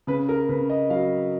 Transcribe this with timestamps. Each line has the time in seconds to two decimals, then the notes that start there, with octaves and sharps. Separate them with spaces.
0.07 C#3 B4
0.29 A#4
0.49 C#3 B4
0.70 D#5
0.90 F#3 F5